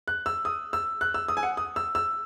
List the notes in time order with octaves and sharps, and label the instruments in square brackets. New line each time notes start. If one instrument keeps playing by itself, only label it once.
[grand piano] F#6
E6
D#6
E6
F#6
E6
D#6
G#5
F#5
D#6
E6
E6